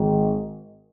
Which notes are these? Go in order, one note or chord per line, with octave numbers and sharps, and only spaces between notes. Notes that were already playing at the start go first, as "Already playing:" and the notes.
Already playing: G#1 G#2 D#3